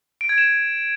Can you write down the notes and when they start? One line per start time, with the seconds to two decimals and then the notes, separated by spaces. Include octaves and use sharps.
0.21 D7
0.29 G#6
0.38 E7